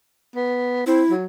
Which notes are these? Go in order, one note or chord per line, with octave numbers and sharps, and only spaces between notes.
B3
C4 E4
F#3